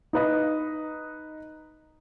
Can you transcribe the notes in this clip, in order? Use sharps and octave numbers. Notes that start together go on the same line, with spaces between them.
D#4 B4 D#5